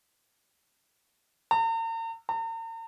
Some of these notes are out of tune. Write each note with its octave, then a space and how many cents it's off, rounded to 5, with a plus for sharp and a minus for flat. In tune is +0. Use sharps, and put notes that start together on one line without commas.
A#5 -45
A#5 -45